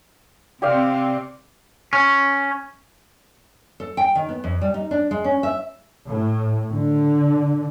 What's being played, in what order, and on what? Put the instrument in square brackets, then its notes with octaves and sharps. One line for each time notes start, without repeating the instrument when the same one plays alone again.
[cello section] C3 C4 [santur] G4 D5 F5
[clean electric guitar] C#4
[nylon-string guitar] A4
G5
D#3
B3
F2
G3
D#4
D4
G#3
C#4
E5
[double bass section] A2
D3